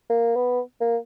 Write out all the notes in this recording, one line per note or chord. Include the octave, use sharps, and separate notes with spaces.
A#3
B3
A#3